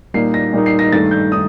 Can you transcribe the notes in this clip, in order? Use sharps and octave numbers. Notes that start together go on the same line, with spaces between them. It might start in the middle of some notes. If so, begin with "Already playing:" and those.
A#2 G3 A#3 D#4 C7
A#6
A#2 G3 A#3 D#4
C7
A#6
G2 D#3 A3 A6
G6
D#3 D#6